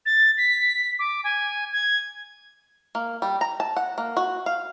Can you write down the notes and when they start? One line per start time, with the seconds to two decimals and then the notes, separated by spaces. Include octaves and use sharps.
0.05 A6
0.37 B6
0.99 D6
1.24 G#5
1.72 G#6
2.95 A#3
3.22 G3
3.41 A#5
3.60 A5
3.76 F#5
3.98 A#3
4.17 F#4
4.46 F5